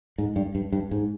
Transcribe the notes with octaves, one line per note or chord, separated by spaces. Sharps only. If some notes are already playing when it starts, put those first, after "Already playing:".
G#2
G2
G2
G2
G#2